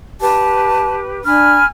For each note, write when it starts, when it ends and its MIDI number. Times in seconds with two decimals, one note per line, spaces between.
0.21 1.23 67
0.21 1.23 71
0.21 0.97 81
1.25 1.57 62
1.25 1.65 80
1.25 1.65 83
1.25 1.65 89